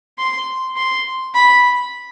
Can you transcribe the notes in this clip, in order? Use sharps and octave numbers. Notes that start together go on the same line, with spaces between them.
C6
C6
B5